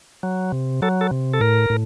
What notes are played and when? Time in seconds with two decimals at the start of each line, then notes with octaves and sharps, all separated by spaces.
0.23 F#3
0.52 C3
0.82 F#3 A4
1.01 A4
1.11 C3
1.33 A4
1.41 A2 A#4
1.70 A2